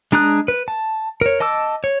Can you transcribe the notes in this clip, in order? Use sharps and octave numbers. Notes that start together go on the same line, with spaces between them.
G#3 D4 A#5 D#6 F#6
B4
A5
A#4 C#5
D#5 A5 D6 E6
C#5